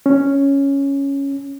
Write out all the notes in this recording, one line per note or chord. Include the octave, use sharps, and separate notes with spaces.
C#4